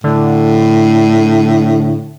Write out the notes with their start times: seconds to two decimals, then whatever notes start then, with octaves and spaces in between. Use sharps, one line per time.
0.04 A2 D3